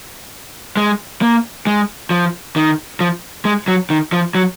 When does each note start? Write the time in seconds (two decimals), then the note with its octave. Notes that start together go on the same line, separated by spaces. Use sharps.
0.77 G#3
1.22 A#3
1.67 G#3
2.10 F3
2.56 D#3
3.00 F3
3.45 G#3
3.68 F#3
3.90 D#3
4.12 F3
4.35 F#3